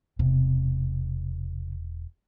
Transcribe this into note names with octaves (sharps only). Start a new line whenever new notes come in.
E1 C3